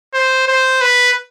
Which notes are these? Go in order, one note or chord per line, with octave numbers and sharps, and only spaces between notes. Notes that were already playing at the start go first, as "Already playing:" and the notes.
C5
C5
B4